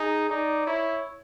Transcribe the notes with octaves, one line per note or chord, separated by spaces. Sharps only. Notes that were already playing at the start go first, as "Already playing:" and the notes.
Already playing: D#4 G#4
D#4 D5
E4 C#5